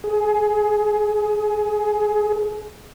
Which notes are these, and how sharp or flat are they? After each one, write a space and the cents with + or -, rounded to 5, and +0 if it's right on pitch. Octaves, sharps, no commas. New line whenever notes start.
G#4 +25